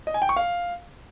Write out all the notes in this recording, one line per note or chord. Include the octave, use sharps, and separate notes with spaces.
D#5
G#5
G5
C#6
F5